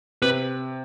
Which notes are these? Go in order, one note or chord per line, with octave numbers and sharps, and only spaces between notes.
C3 B4